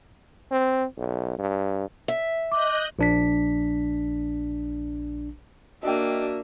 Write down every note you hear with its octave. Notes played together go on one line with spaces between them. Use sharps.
C4
B1
G2
E5
D#5 D6 F#6 G6
A#1 D4 B6
A#3 D4 F#4 D#5 E5 G5